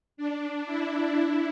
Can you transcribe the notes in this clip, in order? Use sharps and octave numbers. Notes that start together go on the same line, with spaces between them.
D4
E4
E4